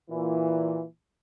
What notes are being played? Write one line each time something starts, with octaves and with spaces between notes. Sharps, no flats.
A#2 E3